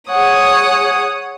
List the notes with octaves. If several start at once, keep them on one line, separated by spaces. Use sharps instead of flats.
G#4 C#5 F#5 D#6